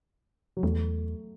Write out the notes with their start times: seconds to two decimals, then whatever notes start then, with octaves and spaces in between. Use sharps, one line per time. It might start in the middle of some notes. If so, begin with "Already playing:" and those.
0.57 F#3
0.63 E2 A3